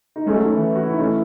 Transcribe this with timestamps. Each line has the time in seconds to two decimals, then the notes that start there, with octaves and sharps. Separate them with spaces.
0.16 D#4
0.26 G#3 A3 C#4
0.35 F#3
0.44 D#3
0.53 E3
0.76 F#4
0.83 E4
0.91 D#4
0.99 A3 C#4